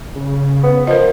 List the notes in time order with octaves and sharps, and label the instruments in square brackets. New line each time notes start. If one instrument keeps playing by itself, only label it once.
[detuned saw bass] C#3
[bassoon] B3
[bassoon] F3 [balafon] A#4 D#5